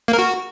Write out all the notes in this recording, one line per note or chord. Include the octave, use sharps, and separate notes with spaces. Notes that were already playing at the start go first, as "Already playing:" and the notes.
A#3
A#4
F#4